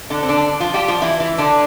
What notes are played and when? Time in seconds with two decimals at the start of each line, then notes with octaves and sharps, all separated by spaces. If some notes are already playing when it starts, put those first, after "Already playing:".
0.10 D3 D4
0.23 C4
0.28 D3 D4
0.60 F3 F4
0.74 G3 G4
0.88 F3 F4
1.02 E3 E4
1.20 E3 E4
1.38 D3 D4